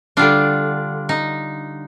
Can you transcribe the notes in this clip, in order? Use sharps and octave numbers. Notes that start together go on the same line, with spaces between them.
D3 G3 D4 F4
D#4